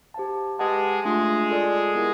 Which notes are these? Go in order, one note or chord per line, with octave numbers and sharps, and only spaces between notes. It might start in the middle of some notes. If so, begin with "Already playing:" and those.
G4 C5 F5 A5
G#3 G4 G#4 B4 D#5 F#5 A5
G#3 A3 D4 F4 G#4
F4 A4 D5
B3 E4 G4 A#4 D#5